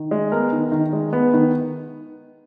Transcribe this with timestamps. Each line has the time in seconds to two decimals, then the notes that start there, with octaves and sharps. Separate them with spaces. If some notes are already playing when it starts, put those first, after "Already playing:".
Already playing: D#3
0.11 G#3
0.32 B3 A#4
0.52 D#3
0.72 D#3
0.93 G#3
1.13 B3
1.34 D#3